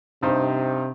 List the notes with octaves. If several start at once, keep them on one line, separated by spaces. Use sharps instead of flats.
G2 C3 D#4 C5